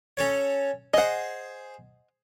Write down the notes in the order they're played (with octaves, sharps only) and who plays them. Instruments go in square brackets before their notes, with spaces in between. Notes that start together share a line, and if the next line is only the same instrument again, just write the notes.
[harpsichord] C#4 A4 C#5
[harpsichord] G#4 C5 [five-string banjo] D#5 F#5